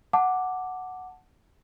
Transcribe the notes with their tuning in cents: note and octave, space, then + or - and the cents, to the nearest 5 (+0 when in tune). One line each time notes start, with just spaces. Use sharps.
F#5 +0 A5 +0 D6 +0